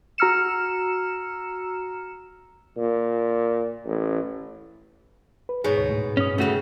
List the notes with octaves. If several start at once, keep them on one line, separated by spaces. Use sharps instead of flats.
F#4 A#5 E6 F6 C#7 E7
A#2
A1
B4
G#2 B2 B3 G#4 C#5
D2 C#5
A2
G2 C#4 D#6
C#3 G3 A3 F#4